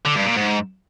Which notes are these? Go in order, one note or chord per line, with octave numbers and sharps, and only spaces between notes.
D3
G2
A#2
G#2